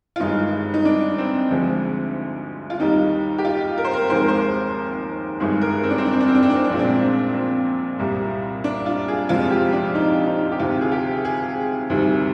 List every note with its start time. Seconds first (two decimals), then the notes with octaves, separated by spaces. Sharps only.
0.16 F4
0.20 G1 G2 D#3 G#3 D#4
0.74 D#4
0.85 D4
1.18 C4
1.51 D2 D3 F3 G#3
2.70 F4
2.80 D#2 D#3 G3 D#4
3.38 G4
3.45 F4
3.78 A#4
3.85 C5
3.93 A#4
4.10 F1 D#2 D#3 G#3 C5
4.19 A#4
4.28 C5
5.40 G1 G2 D#3 G#3 G#4
5.62 A#4
5.83 C4
5.90 D4
5.98 C4
6.05 D4
6.13 C4
6.20 D4
6.28 C4
6.35 D4
6.43 C4
6.50 D4
6.57 C4
6.64 D4
6.70 A#1 A#2 G#3 C4
6.79 D4
6.86 C4
7.35 C4
7.99 C2 A#2 G3
8.64 D4
8.86 F4
9.08 G#4
9.29 F2 C3 F3 G#3 F4
9.51 G4
9.73 D4
9.95 D#4
10.27 D#4
10.52 G4
10.59 D2 C3 D#3 F4
10.81 G#4
10.92 G4
11.25 G#4
11.90 D2 C3 D#3 G3